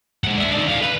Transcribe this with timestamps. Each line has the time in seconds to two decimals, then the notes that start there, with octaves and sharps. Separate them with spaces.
0.24 G#3 F#5
0.37 D4 E5
0.53 D#3 D5
0.68 D3 F5
0.82 B4